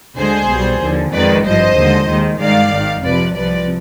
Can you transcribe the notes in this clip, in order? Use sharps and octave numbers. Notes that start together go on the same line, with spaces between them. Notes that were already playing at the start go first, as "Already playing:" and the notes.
D2 D3 G#3 G#4 C5
B1 B2 G3
D#2 D3 F3
F2 D#3 G#3 B4 D5
G#1 G2 F3 C5 D#5
D#2 D3 F3 G#3
D#2 D#3 G#3
G2 D#3 G#3 D5 F5
G#1 G#2 D#3
F2 C3 F3 B4 D5
C2 C3 F3 B4 D5